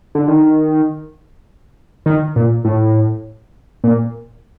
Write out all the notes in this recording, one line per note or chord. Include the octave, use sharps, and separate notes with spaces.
D3
D#3
D#3
A#2
A2
A#2